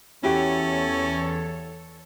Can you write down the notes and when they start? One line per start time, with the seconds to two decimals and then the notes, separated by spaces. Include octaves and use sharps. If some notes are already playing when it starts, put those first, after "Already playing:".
0.23 E2 C#4 E4 F#4 G4 A4 C#5